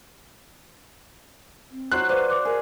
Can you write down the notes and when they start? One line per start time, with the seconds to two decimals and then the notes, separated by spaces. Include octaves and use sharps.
1.71 C4
1.92 F#3 C5 F#6
2.09 B4 C5 D5 F5
2.30 D6
2.45 G#4 A#4